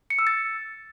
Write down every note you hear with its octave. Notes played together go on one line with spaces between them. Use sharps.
C#7
E6
A6